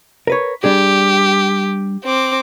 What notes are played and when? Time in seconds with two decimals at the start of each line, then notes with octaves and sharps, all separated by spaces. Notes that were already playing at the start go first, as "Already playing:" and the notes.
0.27 A#4 B4 C#5
0.64 G3 D4 G4 G#4
2.05 C4 D6